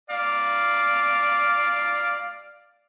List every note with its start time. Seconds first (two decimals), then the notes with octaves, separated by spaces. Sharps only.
0.10 D5 F5